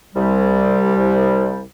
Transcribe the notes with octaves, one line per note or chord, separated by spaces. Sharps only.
C2 G3